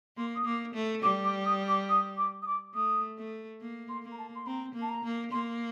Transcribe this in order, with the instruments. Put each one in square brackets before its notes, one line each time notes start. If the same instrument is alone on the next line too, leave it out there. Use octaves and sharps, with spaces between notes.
[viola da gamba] A#3 [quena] C6
[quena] D#6
[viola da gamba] A#3 [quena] D6
[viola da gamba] A3
[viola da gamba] G3 [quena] D6
[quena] D6
D#6
D6
D#6
D6
D#6
D6
[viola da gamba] A3 [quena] D#6
[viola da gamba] A3
A#3
[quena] C6
[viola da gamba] A#3
[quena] A#5
A5
C6
[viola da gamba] C4 [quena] A#5
[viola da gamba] A#3
[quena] A5
A#5
[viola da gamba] A#3
[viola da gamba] A#3 [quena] C6